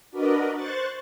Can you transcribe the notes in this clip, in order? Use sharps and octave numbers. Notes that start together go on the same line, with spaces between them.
D4 F#4 A#4 B4 D5 D#5
C5 C#6 F#6 A6